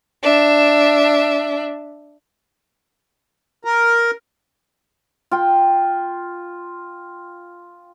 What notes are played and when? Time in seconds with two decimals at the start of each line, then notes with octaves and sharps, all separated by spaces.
0.22 D4 E5
3.65 A#4
5.31 F4 G5